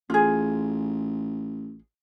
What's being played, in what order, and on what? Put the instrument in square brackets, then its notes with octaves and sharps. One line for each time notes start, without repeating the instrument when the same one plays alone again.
[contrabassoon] A1 [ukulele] F4 G#4